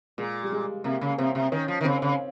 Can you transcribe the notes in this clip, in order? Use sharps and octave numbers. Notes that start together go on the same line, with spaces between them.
A#2 G#3
G3
G#3
C3 A#3
C#3
C3 C4
C3
D#3 C#4
F3
D#3
C#3 C4
C#3